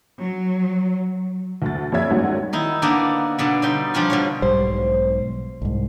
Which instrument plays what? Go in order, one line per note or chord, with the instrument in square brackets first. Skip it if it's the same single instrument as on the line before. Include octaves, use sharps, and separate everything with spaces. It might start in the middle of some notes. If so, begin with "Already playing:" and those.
[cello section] F#3
[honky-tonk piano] D2 A6
F2 G4 C#5 D5 E5 G#6
G#1 G#2 G3 C#4 F#4 F#5
[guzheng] D#3 D#4 E4
D3 A#3 B3 D4 D#4
B2 D3 B3 A5
B2 G3 D#4 D5 G5 C6
F3 G3 D4 F4 G#5
B2 D3 C#5
[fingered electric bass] B1 G#2 G3 [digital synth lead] C5
[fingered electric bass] C2 G#2